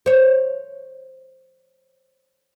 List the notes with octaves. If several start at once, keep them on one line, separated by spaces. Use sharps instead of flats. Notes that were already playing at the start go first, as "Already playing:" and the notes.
C5 C#5